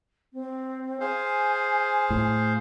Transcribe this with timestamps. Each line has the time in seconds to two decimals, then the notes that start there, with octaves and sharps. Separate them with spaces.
0.33 C4
1.00 G#4 C5 F5 G#5
2.10 A2